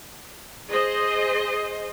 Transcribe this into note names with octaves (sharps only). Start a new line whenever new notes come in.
G#4 C5 D#5